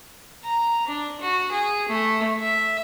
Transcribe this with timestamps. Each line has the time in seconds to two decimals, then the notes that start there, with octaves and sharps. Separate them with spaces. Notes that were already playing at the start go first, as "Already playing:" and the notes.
0.45 A#5
0.87 D4
1.21 F#4
1.52 G#4
1.89 A3
2.40 E5